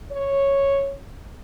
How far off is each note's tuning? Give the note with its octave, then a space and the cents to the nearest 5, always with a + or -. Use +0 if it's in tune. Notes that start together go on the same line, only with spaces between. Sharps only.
C#5 -5